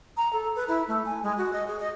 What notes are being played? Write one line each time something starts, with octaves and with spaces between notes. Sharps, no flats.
A#5
A4
B4
E4
A3
G#5
G#3
F#4
D#5
G#4
D#5